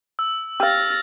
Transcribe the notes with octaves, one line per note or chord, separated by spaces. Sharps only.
E6
G4 F5 F6 A6 A#6